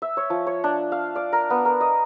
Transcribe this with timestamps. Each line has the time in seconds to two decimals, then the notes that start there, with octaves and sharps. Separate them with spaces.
0.02 E5
0.17 C#5
0.30 F3
0.47 C#5
0.64 D4
0.92 F5
1.16 D5
1.33 A#4
1.50 B3
1.65 A#4
1.81 D#5